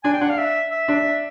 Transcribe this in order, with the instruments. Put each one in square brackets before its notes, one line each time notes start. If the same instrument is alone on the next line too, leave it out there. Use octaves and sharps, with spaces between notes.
[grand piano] D4 [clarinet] G#5
[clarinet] G5
[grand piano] D4 [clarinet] F#5
[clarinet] F5
E5
E5
[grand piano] D4